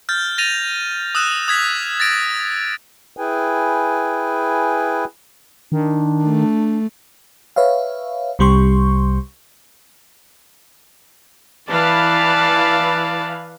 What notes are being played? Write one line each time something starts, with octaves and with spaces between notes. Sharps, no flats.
F6 G6 A6
A6 A#6 D#7 F7
D#6 E6 F#6 E7
D#6 G#6 B6
A6 A#6 D7
E4 G#4 B4 G5 G#5
D#3 D4
A3
B4 C#5 E5 F5
C2 C3 G3 G4 C6 C#6
E3 B4 D5 F5 A5